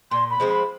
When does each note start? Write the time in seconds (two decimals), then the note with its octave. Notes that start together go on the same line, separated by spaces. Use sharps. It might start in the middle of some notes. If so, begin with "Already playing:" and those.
0.11 A#2 C6
0.30 B5
0.40 F3 G#3 C4
0.49 B5